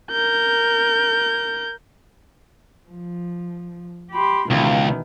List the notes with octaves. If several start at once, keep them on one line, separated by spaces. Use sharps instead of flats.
A#4 G6
F3
G4 B5 C6
C#2 B2 D#3 E3